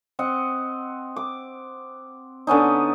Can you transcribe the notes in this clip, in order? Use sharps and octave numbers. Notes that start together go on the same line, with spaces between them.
C4 D#5 F#5
D6
D3 B3 C#4 D#4